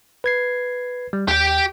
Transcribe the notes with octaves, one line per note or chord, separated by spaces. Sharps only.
B4 G#6 C7
G3
D#2 G4 G5